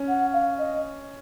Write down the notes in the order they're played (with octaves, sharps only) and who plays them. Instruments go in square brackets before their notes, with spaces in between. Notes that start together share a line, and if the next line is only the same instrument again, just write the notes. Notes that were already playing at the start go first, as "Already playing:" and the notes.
Already playing: [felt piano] C#4
[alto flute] F#5
F5
D#5